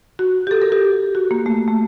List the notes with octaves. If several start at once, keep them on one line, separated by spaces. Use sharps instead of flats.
F#4
G4
A4
A#4
G4
F#4
A#3
A3
A3